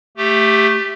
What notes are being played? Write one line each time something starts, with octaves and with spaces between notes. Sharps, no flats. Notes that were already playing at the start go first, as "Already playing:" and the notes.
A3 G4